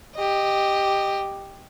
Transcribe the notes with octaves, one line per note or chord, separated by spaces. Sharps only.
G4 D#5